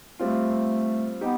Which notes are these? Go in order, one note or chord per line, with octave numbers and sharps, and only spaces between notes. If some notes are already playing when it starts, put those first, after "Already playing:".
G3 A3 C4 F4
B3 D#4 G4